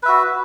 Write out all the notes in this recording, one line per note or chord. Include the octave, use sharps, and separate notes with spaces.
F#4 B4 E5